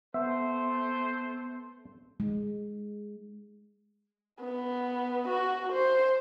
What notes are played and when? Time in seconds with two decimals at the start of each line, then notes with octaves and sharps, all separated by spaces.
0.14 A3 B3 C5 E5
2.20 G#3
4.40 B3
5.28 F#4
5.72 C5